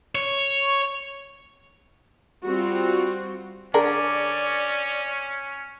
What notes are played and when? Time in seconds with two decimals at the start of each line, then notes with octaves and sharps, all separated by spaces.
0.15 C#5
2.44 G3 C4 F4 F#4
3.74 D3 C#4 G#4 A#4 D5